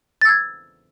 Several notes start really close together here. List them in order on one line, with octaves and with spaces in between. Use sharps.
A6 E6 G#6